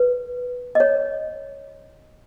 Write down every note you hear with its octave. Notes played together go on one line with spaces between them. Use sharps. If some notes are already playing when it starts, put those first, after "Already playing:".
Already playing: B4
D#5
C#5